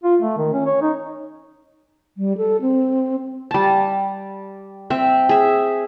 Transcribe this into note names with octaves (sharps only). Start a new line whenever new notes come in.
F4
A3
D#3
C#4
C#5
D#4
G3
A4
C4
G3 A5
C4 E5
G#4 E5